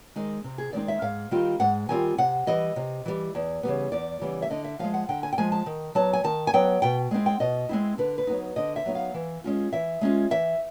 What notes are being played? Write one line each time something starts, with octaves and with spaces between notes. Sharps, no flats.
D#3 G#3 C4 D#4
C3
G#4
D#3 G#3 C4 D#4 D5
E5
G#2 F5
D#3 G3 C4 F4
G#2 F#5
D#3 G3 C4 F4 G#5
C3 F#5
E3 G3 D#5
C3
E3 G3
E2
C#3 E3 G3 B3
E2 D5
C#3 E3 G3 B3
E5
D3 D#5
E5
F3 G#3 F5
F#5
D3 G5
G#5
G5
F3 G#3 G#5
A5
D#3
F#3 B3 A5
G#5
D#3 A5
G#5
F#3 B3 G5
B2 G5
G#3 C4 E4
G5
B2 D#5
G#3 C4 E4
D3 B4
B4
F#3 B3 D#4
D3 D#5
E5
F#3 B3 D#4
F5
E3
G#3 C#4 F4
E3 E5
G#3 C#4 F4
E3 E5